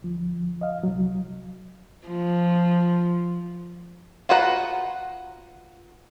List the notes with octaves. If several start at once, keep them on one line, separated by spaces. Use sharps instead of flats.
D2 F3
D#5 F5
C2 F#3
F3
F4 F#4 B4 F#5 A#5